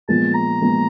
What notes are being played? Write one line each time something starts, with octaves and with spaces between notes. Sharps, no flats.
A#2 F3 G#3 B3 A5
A#5
A#2 F3 G#3 B3